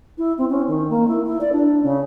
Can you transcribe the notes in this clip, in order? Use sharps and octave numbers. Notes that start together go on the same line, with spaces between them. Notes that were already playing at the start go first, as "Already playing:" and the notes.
E4
C4
C#4
D#3
A#3
E4
E4
D5
D4
C#3